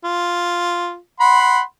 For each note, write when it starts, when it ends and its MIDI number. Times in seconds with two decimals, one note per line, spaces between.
0.04 0.96 65
1.20 1.61 78
1.20 1.61 83
1.20 1.61 84